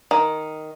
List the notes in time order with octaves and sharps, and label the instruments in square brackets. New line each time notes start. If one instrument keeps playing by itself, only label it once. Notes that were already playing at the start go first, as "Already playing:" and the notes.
[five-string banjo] D#3